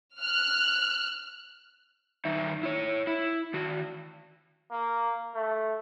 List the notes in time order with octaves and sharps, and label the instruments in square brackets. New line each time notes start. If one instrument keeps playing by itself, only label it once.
[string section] F6 F#6
[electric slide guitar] G2 D#3 D#4 E5
E4 C#5
E4
D#3 F#4
[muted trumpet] A#3
A3